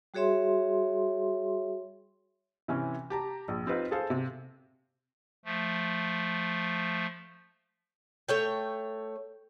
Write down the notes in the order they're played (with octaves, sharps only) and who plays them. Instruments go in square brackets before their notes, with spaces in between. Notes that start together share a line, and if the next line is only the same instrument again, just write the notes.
[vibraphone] G3 F#4 G#4 C#5 E5 C6
[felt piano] C3 E3 C#4
G4 A5 A#5
A#1
C4 D#4 F4 B4
G#4 A4 C5 F5
C3
[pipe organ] F3 A3
[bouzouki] A3 C#5 G5